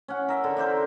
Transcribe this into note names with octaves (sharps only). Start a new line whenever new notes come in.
C#4 F#5
A#4 E5
D3
A#4 C5 D5 E5